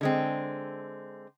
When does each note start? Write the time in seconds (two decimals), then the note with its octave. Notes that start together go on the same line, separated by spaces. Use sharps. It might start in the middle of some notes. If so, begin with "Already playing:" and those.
0.01 D3 G#3 C4